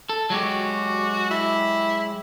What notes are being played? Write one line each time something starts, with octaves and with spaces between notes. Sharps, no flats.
A4
F#3 G#3 F#4 G4
E4